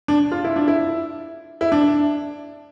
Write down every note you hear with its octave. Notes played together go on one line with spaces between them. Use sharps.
D4
F4
E4
D4
E4
E4
D4